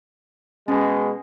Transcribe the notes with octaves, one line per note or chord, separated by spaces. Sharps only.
B2 G#3 C#4